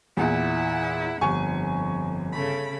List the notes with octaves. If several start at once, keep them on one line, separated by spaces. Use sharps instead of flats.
E2 A#2 E4 F#5
G1 F2 G#5 C#6
C#3 A3 B5